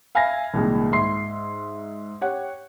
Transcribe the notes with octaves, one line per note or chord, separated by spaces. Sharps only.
E5 F5 G#5 B5 G#6 A#6
C2 A#2 D#3 G#3
G#2 E5 C6 C7
G4 C#5 F#5